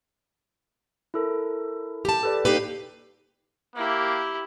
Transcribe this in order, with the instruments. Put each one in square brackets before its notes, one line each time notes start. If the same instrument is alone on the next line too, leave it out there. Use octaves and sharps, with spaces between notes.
[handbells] E4 A4 A#4
[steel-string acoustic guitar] G4 A5
[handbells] A4 B4 D5
[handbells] A#3 C7 [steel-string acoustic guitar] D#4 G4 B4
[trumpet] A#3 [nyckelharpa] E4 G4